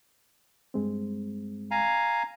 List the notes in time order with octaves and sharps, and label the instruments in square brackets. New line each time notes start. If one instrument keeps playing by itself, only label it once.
[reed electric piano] G2 G#3 C4
[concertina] F5 G#5 A#5